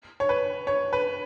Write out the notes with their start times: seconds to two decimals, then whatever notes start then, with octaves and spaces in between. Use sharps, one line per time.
0.20 C#5
0.29 B4
0.67 C#5
0.93 B4